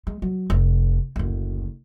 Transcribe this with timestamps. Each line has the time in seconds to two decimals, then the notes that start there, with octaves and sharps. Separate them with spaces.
0.07 G#3
0.22 F#3
0.50 F1
1.16 F#1 D2